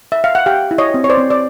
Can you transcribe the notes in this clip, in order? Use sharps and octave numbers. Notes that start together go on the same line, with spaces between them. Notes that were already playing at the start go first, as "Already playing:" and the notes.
E5
F5
F#5
G4 F5 G5
E4
C#5 D#5
C4
C#5
C5 D5
C4
D5